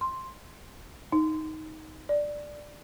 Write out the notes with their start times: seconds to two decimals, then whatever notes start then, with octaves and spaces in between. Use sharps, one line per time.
0.01 C6
1.12 D#4
2.09 D5